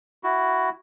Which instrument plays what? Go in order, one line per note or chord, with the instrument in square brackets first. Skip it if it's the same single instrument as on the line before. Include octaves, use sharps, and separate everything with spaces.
[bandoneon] E4 F#4